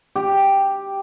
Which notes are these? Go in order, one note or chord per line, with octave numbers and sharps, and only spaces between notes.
G4